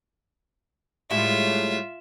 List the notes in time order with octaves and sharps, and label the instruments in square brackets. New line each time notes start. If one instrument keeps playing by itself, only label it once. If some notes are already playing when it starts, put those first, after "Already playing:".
[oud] A2 G3 G#3 [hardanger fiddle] F4 E5